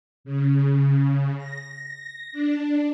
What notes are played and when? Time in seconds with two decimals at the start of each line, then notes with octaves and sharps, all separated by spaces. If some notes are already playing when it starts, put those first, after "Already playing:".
0.24 C#3
1.37 A#6
2.33 D4